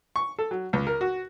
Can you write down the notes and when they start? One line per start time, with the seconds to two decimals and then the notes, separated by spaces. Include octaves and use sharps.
0.16 C#6
0.39 A4
0.51 F#3
0.73 C#2
0.87 A#4
1.01 F#4